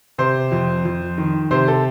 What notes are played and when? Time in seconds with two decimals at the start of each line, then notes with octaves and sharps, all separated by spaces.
0.18 C3 C5
0.51 F2
0.85 F2
1.18 D#3
1.51 C3 C5
1.68 A4